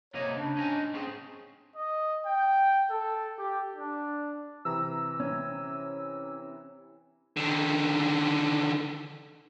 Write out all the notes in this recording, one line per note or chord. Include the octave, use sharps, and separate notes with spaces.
C3 A#3 C#5 D#5
C#3 D4
C#4 D#4 G#5
C4 C#4 G#4
D#5
G5
A4
G4
D4
C3 E3 A#5 E6
C#4
D3 D#3